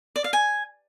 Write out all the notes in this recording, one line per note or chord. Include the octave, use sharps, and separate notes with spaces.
D5
F5
G#5